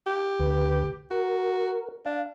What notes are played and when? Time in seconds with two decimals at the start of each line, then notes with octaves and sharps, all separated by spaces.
0.07 G4
0.40 D2 D3 B4
1.11 F#4 A#4
2.06 D4 F5